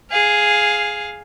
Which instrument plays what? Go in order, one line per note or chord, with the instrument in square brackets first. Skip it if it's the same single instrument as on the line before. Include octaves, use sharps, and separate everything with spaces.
[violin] G#4 F5